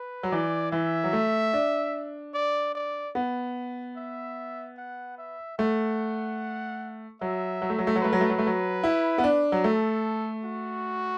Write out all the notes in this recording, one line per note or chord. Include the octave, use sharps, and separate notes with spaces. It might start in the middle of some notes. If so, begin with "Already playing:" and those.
Already playing: B4
F#3
E3 D5
E3 E5
F#3
A3
D4
D5
D5
B3
E5
F#5
E5
A3 F#5
F#3 E5
F#3
A3
F#3
A3
F#3
A3 B4
F#3
A3
F#3
A3
F#3
E4
B3
D4
F#3
A3 A4
F#4